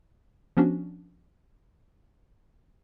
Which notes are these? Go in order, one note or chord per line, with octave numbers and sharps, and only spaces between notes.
F3 B3 C#4 D4 F#4